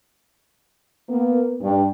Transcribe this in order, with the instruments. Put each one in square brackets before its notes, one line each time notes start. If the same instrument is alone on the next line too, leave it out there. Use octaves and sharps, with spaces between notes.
[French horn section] A#3 B3
G2